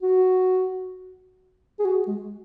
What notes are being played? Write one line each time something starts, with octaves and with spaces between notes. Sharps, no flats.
F#4
G#4
F#4
G#3